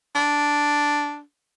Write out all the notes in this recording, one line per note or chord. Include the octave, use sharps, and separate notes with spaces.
D4